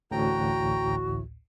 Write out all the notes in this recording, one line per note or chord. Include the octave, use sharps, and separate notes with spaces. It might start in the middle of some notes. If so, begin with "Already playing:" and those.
A1 D2 A2 F#4 G5 A#5